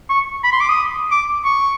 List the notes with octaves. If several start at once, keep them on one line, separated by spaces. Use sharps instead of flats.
C#6
B5
C6
D6
D#6
D6
C#6